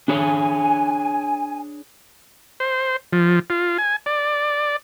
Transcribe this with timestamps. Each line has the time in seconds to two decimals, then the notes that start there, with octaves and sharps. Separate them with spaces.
0.08 D4 G#4 C#5 G#5
2.60 C5
3.13 F3
3.50 F4
3.78 G#5
4.06 D5